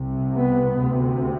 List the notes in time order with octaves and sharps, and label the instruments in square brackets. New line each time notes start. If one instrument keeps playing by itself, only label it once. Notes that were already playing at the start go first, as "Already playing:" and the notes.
Already playing: [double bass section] C2 C3
B3
D2 C3